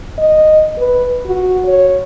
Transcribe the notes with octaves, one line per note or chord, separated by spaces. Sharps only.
D#5
B4
F#4
C#5